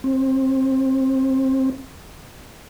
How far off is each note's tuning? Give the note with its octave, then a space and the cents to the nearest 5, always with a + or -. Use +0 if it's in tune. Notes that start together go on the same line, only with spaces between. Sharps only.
C4 +25